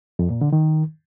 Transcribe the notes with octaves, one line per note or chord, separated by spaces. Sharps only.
F2
A#2
D3
D#3